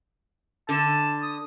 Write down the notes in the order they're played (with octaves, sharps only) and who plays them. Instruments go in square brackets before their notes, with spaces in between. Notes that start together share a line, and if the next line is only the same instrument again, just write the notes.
[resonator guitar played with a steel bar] D3 [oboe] A5
[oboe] D#6